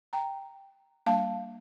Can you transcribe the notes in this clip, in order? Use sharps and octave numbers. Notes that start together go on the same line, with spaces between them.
G5 A#5
G3 A#3 D4 F5 A5